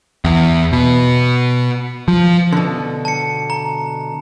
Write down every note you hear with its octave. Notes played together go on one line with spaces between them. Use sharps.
E2
B2
F3
B2 D3
A5 C#7
A#5